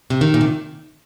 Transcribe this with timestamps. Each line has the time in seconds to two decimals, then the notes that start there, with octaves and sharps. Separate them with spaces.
0.10 C3
0.21 D#3
0.34 A#2
0.41 C3